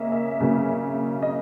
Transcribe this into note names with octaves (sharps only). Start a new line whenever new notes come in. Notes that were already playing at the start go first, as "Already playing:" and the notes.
Already playing: C#3 A#3 C#4 D#5 E5
E5
C#3 F#3 A#3 C#4
D#5